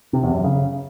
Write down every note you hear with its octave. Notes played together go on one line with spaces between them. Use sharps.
C3
E2
F#2
C#3